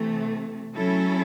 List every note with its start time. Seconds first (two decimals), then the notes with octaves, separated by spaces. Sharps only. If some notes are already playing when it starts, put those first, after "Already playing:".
Already playing: C3 E3 A3
0.76 F#3 A3 C#4 E4 A4